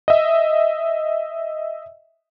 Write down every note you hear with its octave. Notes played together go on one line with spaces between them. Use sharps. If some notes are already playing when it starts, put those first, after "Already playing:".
D#5 E5